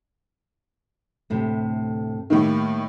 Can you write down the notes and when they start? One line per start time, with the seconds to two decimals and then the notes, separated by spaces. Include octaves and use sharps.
1.30 D2 A2 C3
2.30 A2 D#3 G3 A#3